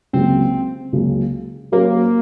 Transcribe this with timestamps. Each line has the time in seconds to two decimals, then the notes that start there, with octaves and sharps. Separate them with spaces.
0.13 C#2 C#3 F#3 A#3 C4
0.93 C#2 C#3 F#3 A#3
1.72 F#3 A#3 C#4 F#4 C5